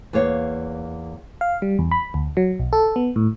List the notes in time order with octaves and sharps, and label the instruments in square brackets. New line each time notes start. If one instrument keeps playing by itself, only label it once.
[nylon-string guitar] E2 A#3 C#5 F5
[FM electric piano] F5
G3
E2
B5
D2
F#3
B1
A4
B3
A2